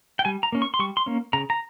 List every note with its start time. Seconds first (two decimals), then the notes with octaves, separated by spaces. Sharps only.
0.19 G5
0.25 G3 G#5
0.43 A#5
0.52 A#3 C#4
0.62 C#6
0.74 C6
0.79 G3 C#6
0.97 C6
1.06 A#3 C#4
1.33 C#3 A#5
1.50 A#5